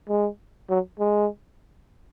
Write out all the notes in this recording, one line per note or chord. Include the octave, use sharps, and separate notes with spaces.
G#3
F#3
G#3